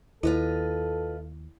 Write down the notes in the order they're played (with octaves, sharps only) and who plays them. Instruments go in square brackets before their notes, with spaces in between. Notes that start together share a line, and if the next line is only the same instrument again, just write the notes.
[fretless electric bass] D#2 [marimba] E4 [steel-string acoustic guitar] F4 B4 D#5 [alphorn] A4